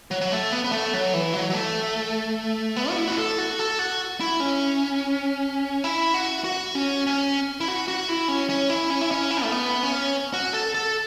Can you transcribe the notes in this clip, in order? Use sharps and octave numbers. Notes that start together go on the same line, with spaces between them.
F#3
F#3
A3
B3
B3
A3
F#3
E3
F#3
F#3
A3
B3
F#4
E4
F#4
A4
F#4
A4
F#4
E4
C#4
E4
F#4
F#4
C#4
C#4
E4
F#4
F#4
E4
C#4
C#4
E4
C#4
E4
C#4
E4
A3
B3
C#4
F#4
A4
A4